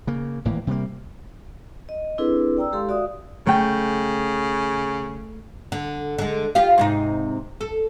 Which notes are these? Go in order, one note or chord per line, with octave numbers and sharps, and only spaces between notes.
C#3 A#3
G#1 A2 E3 A#3
C3 G3 G#3 A#3
D#5
C4 D4 E4 G#4 A4 B4
D5 G5 A#5 E6
G#3 G4 A4 F5 C6
F#4 D5 E5 F5 D#6
C#3 A3 G5
D3
D3 G#3
F4 G4 F5
G#2 C3 D#4
A4